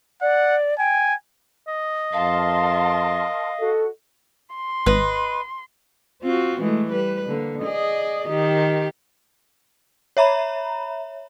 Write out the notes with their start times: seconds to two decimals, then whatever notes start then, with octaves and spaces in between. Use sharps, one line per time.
0.22 D5 F#5
0.78 G5 G#5
1.68 D#5
2.13 F2 A#4 F5 A5 C6
3.60 F#4 A4
4.55 C6
4.86 G#1 B4 D#5
6.22 C4 F4 F#4
6.60 E3 G#3 A3
6.91 G3 B4
7.27 D3 A#3
7.62 G#4 D5 D#5
8.29 D#3 G4
10.17 C#5 E5 A#5 B5